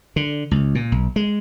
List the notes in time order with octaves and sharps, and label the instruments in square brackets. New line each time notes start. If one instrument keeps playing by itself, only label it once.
[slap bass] D3
C#2
A#2
B1
G#3